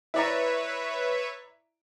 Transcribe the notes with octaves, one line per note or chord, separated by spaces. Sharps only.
E4 B4 C#5 D5 E5 A#5